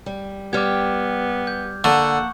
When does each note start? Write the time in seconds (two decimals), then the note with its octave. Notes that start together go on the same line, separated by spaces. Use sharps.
0.06 G3
0.53 G3 B3 G4 D6 F6 G#6
1.47 G6
1.84 D3 A#3 F#5 A5 C#6